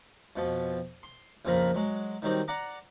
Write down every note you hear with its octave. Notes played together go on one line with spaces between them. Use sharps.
F2 B2 F3
C6
A#1 F2 C#3 C4 A#4 B5
F#3 G#3
D#3 F#3 G3 C4 D#4
D5 F#5 A#5 D6